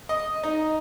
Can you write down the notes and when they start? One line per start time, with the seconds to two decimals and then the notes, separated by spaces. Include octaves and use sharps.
0.09 D#5
0.43 D#4